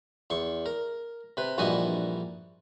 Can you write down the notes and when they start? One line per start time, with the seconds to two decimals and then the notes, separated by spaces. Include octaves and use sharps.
0.30 E2 C6 C#6
0.66 A#4
1.37 C3 B4
1.58 A#1 G2 E3 F#4 D#5 G#5